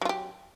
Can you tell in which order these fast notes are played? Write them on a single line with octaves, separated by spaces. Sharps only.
F#3 F4 G4